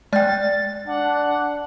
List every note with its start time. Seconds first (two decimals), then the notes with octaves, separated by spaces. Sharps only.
0.13 G#3 D5 G5 F6 F#6 A6
0.87 D4 F#5